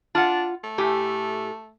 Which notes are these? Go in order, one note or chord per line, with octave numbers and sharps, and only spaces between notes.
D4 F4 F#5
A3
A2 G4 G#5